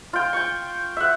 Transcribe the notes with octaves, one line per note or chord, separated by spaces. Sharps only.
F4 G5
G5 C#6
E5 F#5